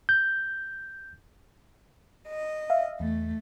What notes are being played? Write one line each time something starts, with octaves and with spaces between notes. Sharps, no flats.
G6
D#5
E5 F5
E2 A3